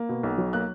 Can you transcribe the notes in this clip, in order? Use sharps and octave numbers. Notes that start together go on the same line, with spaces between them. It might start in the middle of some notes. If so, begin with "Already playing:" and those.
Already playing: A#3
B2
B1
F#3
A#3 F#6